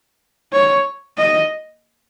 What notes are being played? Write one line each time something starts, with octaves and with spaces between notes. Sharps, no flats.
C#5
D#5